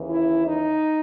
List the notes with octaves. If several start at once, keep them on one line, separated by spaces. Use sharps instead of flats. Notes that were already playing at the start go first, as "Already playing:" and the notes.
Already playing: D#2 C#3 E3
E4
D#4